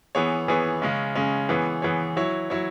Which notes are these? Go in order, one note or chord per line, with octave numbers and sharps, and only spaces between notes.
E3 B3 G#4 C#5
E3 B3 G#4 C#5
C#3 G#3 C#4
C#3 G#3 C#4
E3 B3 G#4 C#5
E3 B3 G#4 C#5
F#3 E4 C#5
F#3 E4 C#5